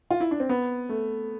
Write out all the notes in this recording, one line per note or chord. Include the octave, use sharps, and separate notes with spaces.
F4
E4
D4
C4
B3
A3